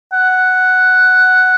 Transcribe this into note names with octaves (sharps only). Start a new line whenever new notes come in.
F#5